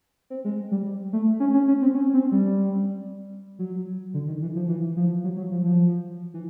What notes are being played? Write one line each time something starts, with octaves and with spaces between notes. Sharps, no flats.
C4
G#3
G3
A3
C#4
C#4
C#4
C4
C#4
C4
G3
F#3
D3
D#3
E3
F3
E3
F3
F#3
F#3
F3
F3
E3